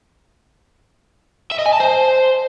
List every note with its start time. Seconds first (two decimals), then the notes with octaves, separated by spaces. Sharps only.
1.52 E5
1.59 D#5
1.66 G#5
1.73 A5
1.80 C5